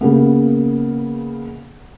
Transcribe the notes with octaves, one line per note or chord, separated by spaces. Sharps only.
C#3 A#3 B3